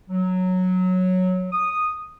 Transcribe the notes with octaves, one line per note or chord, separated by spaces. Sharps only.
F#3
D#6